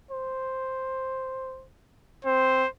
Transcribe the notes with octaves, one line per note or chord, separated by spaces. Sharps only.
C5
C4 C5